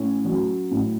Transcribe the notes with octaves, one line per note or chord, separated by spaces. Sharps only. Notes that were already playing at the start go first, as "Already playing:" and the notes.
Already playing: A2 C#4
F#3
A2